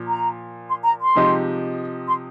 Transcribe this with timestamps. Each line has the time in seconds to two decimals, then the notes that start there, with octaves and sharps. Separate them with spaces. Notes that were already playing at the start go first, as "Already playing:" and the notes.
Already playing: A#2 F3
0.08 A#5
0.69 C6
0.84 A#5
1.01 C6
1.15 C3 F3 G#3 D#4 G4
2.07 C6